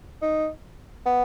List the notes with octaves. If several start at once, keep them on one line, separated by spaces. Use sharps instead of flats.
D#4
B3